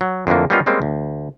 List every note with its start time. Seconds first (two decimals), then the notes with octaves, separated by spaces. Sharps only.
0.01 F#3
0.27 F2 D3 E3 A3 A#3
0.50 G3 A#3 B3 C#4 D#4 F4
0.66 G3 G#3 A#3 C4 C#4
0.82 D2